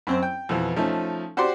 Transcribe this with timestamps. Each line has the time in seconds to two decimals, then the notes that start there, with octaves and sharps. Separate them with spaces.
0.07 F#2 C4 C5
0.23 G5
0.49 F2 B2 E3
0.76 F3 A3 C#4 D#4
1.37 F#4 G4 C5 D5 C6